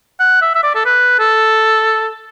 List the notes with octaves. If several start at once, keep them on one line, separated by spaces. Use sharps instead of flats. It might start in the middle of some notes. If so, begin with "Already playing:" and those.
F#5
E5
E5
D5
A4
B4
A4